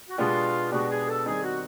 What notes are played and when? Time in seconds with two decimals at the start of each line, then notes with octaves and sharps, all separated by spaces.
0.09 F#4
0.18 B2 G#3 B3 D4 F4 G4
0.71 B2 G#3 B3 D4 F#4 G4
0.90 G#4
1.08 A4
1.26 D#3 G3 C4 D#4 G#4
1.43 F#4